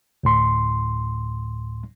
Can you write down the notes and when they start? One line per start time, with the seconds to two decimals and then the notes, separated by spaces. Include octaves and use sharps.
0.23 D2 A2 C6